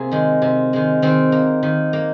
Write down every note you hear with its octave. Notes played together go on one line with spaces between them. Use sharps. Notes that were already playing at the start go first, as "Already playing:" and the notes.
Already playing: C3 A#3 G#4
D#3 G#3
C3
D#3 G#3
D#3 C4
A#3
D#3
A#3